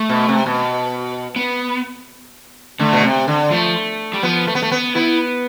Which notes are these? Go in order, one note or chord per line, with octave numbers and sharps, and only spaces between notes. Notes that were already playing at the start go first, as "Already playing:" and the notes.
Already playing: A3
B2
C3
B2
B3
D3 A3
B2
C3
D3
F3 A3
G3
F3 B3
A3
B3
A3
B3
B3 E4